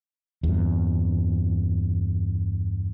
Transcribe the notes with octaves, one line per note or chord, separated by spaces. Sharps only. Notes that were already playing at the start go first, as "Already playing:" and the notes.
E2 G2